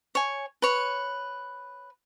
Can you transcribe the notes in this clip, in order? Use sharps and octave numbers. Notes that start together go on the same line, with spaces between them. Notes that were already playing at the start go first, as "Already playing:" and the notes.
C#5 G#5
B4 C#5